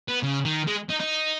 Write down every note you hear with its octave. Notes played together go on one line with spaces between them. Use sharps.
B3
C#3
D#3
G#3
D#4
D#4